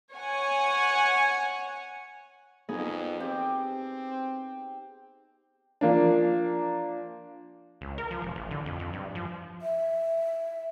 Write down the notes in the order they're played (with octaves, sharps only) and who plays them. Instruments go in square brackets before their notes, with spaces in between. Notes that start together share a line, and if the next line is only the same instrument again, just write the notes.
[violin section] C#5 F#5 G#5
[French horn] F2 [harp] B3 D#4 G#4
[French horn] C4 [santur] G4
[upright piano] F3 A#3 D4
[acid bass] C#2
A#4
F3
E1
A1
D3
F2
F2
G2
F3
[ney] E5